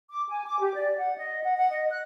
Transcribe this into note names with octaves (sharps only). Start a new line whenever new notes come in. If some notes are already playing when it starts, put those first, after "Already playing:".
D6
G#5
D6
G4
D5
F#5
D#5
F#5
F#5
D#5
F#6